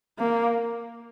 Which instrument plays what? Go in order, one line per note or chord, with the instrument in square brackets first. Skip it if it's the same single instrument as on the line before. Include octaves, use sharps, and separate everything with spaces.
[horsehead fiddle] A#3